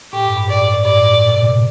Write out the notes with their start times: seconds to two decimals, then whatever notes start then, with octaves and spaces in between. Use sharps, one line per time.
0.13 A2 G4
0.24 G2
0.37 G2
0.49 A2 D5
0.61 G2
0.73 A2
0.85 G2 D5
0.97 A2
1.09 A2
1.21 A#2
1.33 C3
1.44 A#2